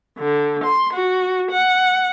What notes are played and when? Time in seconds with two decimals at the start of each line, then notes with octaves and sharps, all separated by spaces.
0.18 D3
0.63 C6
0.93 F#4
1.51 F#5